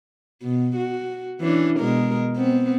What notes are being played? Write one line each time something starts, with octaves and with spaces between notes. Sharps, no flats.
B2
F#4
E3 C#4 D4
B2 G#3 A#4
B3 C4